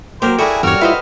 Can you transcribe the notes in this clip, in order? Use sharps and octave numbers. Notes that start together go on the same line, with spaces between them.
F#3 A3 A#3 G4 A#4 C5
G3 E4 F#4 G#4 A4 G#5
E2 G2 G3 F#4 A#4 C#5 F6
E4 F4 B4 C5 D#5 E5